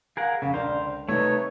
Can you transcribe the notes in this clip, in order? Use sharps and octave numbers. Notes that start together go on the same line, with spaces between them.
G#4 A#4 F5 F#5
F2 C#3 F5
C#2 D3 A#4 C5 D5 F5
C3 D#3 G3 A3 D#4 B4 C#5